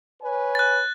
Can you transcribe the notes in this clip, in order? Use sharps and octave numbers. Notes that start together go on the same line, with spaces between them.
B4 C#5 G#5
F#6 A6